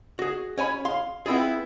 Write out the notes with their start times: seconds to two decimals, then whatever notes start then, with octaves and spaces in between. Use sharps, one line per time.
0.19 F#4 G#4
0.58 C#4 C#5 G#5 B5
0.85 F5 C6
1.26 B3 C4 E4 F4 G#4